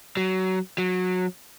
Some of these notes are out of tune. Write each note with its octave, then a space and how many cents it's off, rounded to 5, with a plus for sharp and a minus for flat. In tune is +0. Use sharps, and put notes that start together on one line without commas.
F#3 +20
F#3 -20